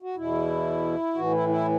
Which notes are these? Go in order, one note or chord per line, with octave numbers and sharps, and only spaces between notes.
F#4
E2 B2 E4
A2 E3 F#4
E4
E4